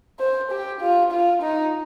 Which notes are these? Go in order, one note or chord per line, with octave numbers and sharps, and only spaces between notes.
C5
G4
F4
F4
D#4